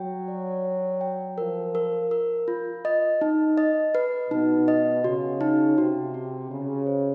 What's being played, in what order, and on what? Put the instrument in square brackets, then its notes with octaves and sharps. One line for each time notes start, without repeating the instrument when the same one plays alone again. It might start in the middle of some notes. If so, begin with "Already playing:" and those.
Already playing: [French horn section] F#3 [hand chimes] G5
[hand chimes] D5
G5
G5
[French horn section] F3 [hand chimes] A#4
[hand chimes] A#4
A#4
F4
D#5
D#4
D#5
B4
[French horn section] B2 [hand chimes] D#4
[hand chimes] D#5
[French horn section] C#3 [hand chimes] F#4
[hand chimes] D#4
[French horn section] C3 [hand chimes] F#4
[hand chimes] F#4
[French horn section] C#3 [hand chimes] F#4
[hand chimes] C5